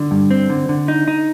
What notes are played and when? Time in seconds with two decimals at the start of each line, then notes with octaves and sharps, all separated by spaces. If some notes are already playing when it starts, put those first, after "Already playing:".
Already playing: D3
0.11 G2
0.31 C4
0.50 D3
0.69 D3
0.88 D#4
1.08 D#4